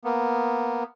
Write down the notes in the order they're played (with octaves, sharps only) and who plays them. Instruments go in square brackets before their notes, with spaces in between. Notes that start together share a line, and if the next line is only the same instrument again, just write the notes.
[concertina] A#3 B3